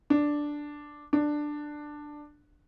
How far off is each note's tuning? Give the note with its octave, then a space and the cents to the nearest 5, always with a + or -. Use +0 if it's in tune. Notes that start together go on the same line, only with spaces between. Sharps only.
D4 +0
D4 +10